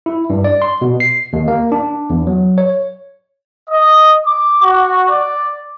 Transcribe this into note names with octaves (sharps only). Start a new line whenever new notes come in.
E4
G2
D5
C6
B2
C7
D#2
A#3
D4
E2
F#3
C#5
D#5
D6
F#4
D5